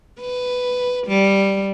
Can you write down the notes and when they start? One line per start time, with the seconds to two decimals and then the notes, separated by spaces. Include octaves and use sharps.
0.21 B4
1.07 G3